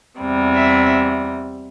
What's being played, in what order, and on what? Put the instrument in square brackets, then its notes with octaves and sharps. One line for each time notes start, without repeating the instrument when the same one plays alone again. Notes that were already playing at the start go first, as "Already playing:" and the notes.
[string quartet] E2 C3 G3
E5